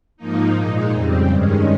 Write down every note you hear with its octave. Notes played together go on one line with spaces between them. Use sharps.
G#2 F3 A#3 D#4
A#2 G#3 D#4
F2 C#3 G3 C4
G2 D#3 G#3 C#4